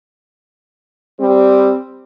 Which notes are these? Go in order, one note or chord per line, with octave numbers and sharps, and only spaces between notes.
G3 C4